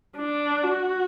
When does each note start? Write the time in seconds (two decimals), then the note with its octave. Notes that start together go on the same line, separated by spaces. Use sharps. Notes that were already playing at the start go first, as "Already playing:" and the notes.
0.17 D4
0.63 F#4